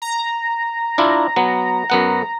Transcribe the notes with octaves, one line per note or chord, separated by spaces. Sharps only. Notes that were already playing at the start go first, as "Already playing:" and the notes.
A#5
D4 E4 F4
F#3 B3
F#2 B3 F#5